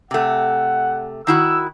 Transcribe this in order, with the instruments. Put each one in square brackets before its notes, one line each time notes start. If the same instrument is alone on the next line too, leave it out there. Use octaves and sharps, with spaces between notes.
[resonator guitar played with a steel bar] C3 A3 [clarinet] F#5
[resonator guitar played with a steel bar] D#3 E4 F#4 [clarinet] E6